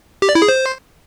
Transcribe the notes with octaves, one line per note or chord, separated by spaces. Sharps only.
G4
D5
E4
G#4
C5